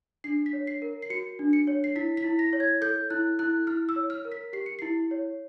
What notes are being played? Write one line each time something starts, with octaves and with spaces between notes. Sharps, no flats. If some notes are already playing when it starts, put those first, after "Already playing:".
D4 C7
B6
C#5
C7
A#4
C7
F#4 C#7
D4
C#7
C#5
C7
E4 B6
B6
E4
A#6
C#5
G#6
A4 G6
E4 F#6
E4 F#6
E4 F6
E6
C#5
F6
A#4
B6
G4 C7
C#7
E4 C7
C#5